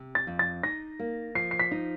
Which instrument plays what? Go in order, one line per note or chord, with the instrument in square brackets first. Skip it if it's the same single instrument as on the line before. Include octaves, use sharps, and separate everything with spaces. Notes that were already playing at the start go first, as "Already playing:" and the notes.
Already playing: [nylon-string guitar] C3
[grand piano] A6
[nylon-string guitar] F2
[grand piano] A6
[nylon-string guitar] D#4 [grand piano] A#6
[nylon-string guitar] A#3
[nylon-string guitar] F3 [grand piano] C7
[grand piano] C7
B6
[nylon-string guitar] D#4